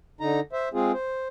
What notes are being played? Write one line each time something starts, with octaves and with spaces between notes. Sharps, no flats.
D3 D#4 A#5
C5 E5
G#3 C4 F4 G#4
C5